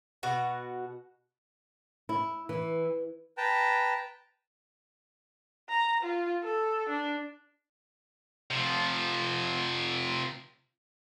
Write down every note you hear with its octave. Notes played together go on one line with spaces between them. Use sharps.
B2 F#4 F#5
E4
E3
B4 G5 A5 A#5
A#5
F4
A4
D4
C3 F3